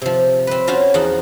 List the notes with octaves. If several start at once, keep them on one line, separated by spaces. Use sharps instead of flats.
C3 F3
C4 B4
C#4 F4 F#4 C5
E2 F3 D#4 F#5